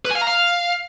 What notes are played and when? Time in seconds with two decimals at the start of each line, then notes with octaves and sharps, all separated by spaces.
0.05 B4
0.11 G#5
0.16 F5
0.21 A#5
0.27 F5